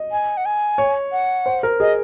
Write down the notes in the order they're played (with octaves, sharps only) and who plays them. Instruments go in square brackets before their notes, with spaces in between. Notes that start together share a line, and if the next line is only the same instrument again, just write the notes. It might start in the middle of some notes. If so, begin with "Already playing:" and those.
Already playing: [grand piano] D#5
[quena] G#5
F#5
G#5
[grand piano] C#5
[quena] F#5
[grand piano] C5
A#4
[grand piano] G#4 [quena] D#5